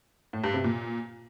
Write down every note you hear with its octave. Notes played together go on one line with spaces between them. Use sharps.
A2
G2
C3
A#2